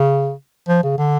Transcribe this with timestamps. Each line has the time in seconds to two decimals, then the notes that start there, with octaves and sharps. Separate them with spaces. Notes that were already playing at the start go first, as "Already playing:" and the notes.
Already playing: C#3
0.68 F3
0.84 C#3
0.98 D3